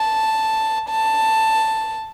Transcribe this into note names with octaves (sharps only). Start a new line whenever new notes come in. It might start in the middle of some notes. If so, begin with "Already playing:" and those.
Already playing: A5
A5